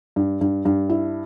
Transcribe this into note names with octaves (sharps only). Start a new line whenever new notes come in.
G2
G2
G2
E4